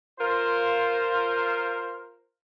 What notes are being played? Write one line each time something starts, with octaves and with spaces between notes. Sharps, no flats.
F4 A#4 C5